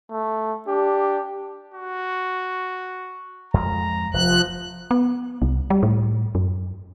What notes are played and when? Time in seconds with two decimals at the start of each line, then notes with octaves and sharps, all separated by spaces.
0.11 A3
0.68 D4 G4
1.74 F#4
3.54 F2 G#3 A#5
4.14 F1 F3 F#6
4.91 B3
5.42 C2
5.70 G3
5.83 A2
6.35 F#2